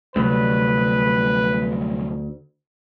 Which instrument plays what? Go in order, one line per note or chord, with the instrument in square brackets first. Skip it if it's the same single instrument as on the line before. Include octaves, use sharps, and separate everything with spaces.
[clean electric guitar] D2 [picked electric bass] C3 F#3 G3 [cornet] B4